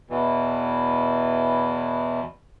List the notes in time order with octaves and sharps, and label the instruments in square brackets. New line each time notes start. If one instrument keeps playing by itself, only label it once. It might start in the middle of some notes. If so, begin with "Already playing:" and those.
[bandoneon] E2 B2 E3